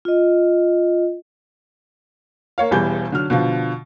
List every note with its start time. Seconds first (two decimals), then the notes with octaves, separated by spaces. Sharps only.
0.05 F4 D#5
2.58 A#3 C#5 F5
2.71 E1 E2 E3 G3 G6
3.12 D3 F#3 F6
3.30 B2 D3 F3